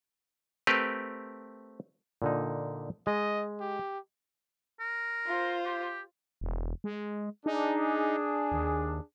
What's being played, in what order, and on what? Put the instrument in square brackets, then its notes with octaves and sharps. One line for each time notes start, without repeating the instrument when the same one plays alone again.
[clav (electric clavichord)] A3 C4 G4 A#4 B4
A#2 D3 D#4
[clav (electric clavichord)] G#3 [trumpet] D#5
[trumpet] G4
[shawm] A#4
[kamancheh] F4 C5
[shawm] G4
[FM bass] E1
G#3
[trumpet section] D4 G#4 [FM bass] D#4
[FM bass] D#2